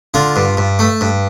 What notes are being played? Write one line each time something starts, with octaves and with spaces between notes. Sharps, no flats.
D3 F4
G2
G2
A3
G2